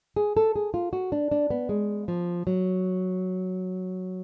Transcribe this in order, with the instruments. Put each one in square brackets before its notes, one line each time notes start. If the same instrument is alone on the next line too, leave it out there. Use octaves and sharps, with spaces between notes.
[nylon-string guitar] G#4
A4
G#4
F4
F#4
D4
D4
B3
G#3
F3
F#3